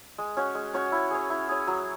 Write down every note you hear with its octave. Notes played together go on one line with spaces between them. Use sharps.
G#3
C#4 F#4 C#5
G#3
C#4 F#4 C#5
E4
G#4 C#5
E4
G#4 C#5
F#3